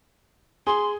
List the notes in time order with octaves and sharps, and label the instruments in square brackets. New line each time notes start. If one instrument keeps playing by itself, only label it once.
[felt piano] G#4 [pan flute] C6